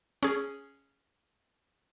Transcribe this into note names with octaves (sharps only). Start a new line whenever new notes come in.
C#4 G#4